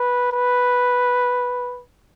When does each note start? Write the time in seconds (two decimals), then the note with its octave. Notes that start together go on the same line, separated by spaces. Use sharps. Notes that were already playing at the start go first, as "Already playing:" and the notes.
Already playing: B4
0.32 B4